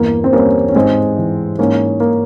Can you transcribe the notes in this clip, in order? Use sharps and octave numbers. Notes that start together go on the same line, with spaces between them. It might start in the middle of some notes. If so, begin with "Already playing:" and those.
Already playing: E2 G2 A#3
C4
G3 A#3 C#4
C#4
G#2 G#3 C4
E3
G#2 A#3 C#4
A#3